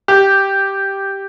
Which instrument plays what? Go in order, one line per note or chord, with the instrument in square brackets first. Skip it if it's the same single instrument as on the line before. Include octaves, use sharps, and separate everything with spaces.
[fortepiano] G4